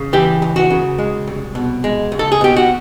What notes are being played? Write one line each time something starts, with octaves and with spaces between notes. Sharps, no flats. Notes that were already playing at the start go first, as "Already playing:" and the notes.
Already playing: C#3
E3 G4
C#2
F#4
C#3
G#3
C2
B2
G#3
C#2
A4
G#4
B2 G4
F#4